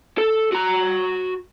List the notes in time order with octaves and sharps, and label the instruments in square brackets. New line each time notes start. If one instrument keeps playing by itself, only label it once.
[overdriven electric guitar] A4
F#4 A#5